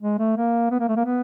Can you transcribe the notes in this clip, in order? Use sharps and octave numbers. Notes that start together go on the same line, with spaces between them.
G#3
A3
A#3
B3
A#3
A3
A#3
B3